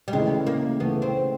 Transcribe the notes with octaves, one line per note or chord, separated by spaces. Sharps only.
G3
C#3 E3 G#3 A3
A#3
C#3 E3 A3 B3
C4